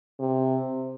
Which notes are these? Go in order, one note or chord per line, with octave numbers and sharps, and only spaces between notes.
C3